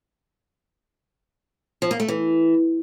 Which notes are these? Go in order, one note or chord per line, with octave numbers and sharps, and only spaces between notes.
F3
A#3
A3
E3